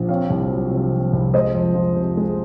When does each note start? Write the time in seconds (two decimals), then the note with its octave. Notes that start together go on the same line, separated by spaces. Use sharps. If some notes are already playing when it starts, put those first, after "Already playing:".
Already playing: A#1
0.09 C4 C#5 F5
0.30 C2
0.51 F#3
0.71 C3
0.93 C4
1.13 C2
1.34 G#3 C5 D#5
1.55 F2
1.75 F3
1.96 C3
2.17 G#3